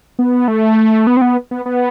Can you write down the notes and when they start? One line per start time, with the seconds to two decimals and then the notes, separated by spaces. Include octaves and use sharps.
0.19 B3
0.48 A3
1.07 B3
1.17 C4
1.22 B3
1.51 B3
1.66 B3